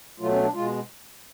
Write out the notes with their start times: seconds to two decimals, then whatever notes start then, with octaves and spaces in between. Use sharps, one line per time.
0.20 B2 F#3 A3 F4
0.31 C#4
0.42 D4
0.53 B2 G#3 F4